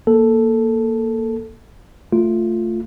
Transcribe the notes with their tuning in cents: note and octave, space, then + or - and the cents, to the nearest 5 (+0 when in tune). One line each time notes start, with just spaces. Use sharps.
A#3 +0 A4 +0
A3 +10 F4 +0